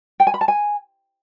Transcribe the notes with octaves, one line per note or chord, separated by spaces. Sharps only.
G5
G#5
B5
A5
G#5